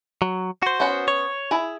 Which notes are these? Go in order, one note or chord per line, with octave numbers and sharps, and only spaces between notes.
F#3
F#4 C5
B3 C#4 F#5
C#5
E4 G#4